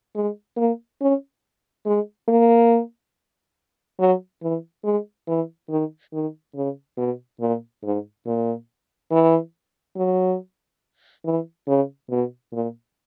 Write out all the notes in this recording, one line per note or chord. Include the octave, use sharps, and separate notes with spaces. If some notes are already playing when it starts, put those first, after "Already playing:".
G#3
A#3
C#4
G#3
A#3
F#3
E3
G#3
E3
D#3
D#3
C#3
B2
A#2
G#2
A#2
E3
F#3
E3
C#3
B2
A#2